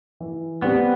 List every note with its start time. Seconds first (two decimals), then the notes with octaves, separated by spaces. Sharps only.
0.20 E3
0.62 G3 B3 C4 G4 D5